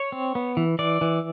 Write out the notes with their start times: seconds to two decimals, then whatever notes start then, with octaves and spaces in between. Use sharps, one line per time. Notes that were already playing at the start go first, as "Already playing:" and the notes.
Already playing: C#5
0.12 C4
0.35 B3
0.57 E3
0.79 E3 D5
1.01 E3